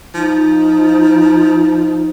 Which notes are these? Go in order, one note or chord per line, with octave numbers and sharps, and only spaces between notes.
F3 D#4